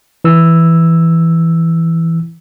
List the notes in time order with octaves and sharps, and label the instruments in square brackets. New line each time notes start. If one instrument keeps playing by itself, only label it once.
[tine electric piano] E3 E6